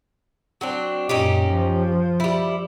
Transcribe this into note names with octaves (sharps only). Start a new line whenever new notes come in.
F#3 C4 D4
F#2 A#2 C#4 D#4 G4
F3
G3 E4